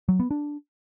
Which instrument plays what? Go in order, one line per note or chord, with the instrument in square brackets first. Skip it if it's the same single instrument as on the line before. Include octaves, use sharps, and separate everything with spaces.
[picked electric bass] F#3
B3
D4